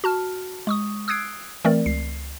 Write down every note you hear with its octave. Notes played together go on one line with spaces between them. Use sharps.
F#4 A5 F6
G#3 C#6 D#6
D#6 E6 F#6 G#6 C7 D7
E3 A3 C4 A#4 D5
C#2 C7